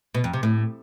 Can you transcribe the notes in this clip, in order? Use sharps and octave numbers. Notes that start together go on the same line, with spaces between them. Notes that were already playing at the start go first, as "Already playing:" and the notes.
B2
F2
C3
A2